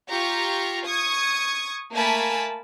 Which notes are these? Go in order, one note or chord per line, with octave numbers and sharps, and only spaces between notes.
F4 G4 A#5 C#6
C#6 D#6 G#6
A3 A#3 A#4 G#5 A5 B5